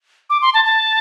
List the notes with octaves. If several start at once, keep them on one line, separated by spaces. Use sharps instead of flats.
D6
C6
A5
A5